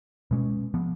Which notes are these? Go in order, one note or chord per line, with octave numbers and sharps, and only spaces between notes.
B2 G#3 C#4
F3 B3